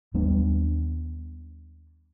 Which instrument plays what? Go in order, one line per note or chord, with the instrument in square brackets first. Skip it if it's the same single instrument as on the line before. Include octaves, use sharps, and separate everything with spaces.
[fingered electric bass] D#2 G3 B3 D4